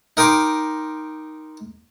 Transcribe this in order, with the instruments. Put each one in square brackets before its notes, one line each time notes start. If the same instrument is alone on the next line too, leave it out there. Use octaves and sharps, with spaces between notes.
[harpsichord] D#4 A#4 G5 C6 D6